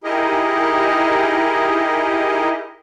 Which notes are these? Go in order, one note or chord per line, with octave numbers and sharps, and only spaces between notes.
D#4 E4 G4 G#4 A#4 D#5